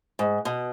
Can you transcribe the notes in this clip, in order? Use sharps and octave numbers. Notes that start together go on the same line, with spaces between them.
G#2
B2